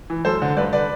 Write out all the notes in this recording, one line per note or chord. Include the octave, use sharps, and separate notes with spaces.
E3
F#2 A4 C5
D3
G2 B4 D5
D3 B4 D5